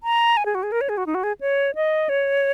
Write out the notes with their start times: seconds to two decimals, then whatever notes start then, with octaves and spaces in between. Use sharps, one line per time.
0.03 A#5
0.37 G#5
0.46 G#4
0.55 F#4
0.63 G#4
0.72 A#4
0.81 C#5
0.89 G#4
0.97 F#4
1.06 D#4
1.15 F#4
1.24 G#4
1.41 C#5
1.75 D#5
2.09 C#5